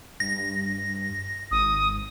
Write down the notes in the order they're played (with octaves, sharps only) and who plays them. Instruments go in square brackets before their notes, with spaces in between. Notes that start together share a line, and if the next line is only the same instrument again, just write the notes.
[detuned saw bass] G2 [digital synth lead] A#6
[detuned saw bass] G#1 [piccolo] D#6